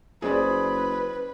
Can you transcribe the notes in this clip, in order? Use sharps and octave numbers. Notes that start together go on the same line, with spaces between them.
F#1 G#4 B4 C5 D5